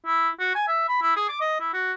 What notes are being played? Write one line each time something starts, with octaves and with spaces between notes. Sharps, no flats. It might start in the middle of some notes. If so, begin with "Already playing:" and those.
E4
F#4
G#5
E5
B5
E4
G#4
D6
D#5
E4
F#4